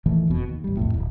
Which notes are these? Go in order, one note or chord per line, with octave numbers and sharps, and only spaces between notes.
A#1 D#3 E3 A3
E1 F2 B2
D#2
A1 G3
B1 F2 A2
D1